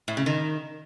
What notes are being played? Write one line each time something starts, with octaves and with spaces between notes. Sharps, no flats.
A2
C#3
D#3